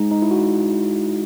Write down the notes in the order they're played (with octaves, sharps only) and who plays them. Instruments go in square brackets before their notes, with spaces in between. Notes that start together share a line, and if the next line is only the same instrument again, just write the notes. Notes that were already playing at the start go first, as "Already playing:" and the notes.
Already playing: [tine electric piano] G#3 D#4
D#4
E4
F#4